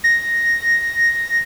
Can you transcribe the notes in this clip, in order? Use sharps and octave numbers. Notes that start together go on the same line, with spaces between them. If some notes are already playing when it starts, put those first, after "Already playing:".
A#6